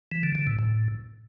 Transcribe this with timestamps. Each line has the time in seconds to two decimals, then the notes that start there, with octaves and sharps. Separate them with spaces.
0.12 E3
0.23 D3
0.35 D3
0.47 A2
0.59 A2